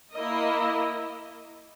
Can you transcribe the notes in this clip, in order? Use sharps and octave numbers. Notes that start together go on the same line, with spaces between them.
A#3 E4 A#4 D#5